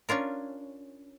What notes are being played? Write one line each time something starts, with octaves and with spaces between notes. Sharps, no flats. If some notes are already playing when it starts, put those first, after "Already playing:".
C#4 D4 F4 A#4